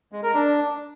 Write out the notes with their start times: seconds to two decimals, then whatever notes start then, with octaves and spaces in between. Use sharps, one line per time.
0.12 G#3
0.23 A#4
0.34 D4